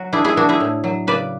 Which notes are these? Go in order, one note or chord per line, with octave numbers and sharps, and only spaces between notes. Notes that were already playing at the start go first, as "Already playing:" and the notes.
Already playing: F#3 F#4
D4 E4 G#4
E4 G#4
B3 D4 F#4
E4 G#4
A2
F#3
C#3 B4 D5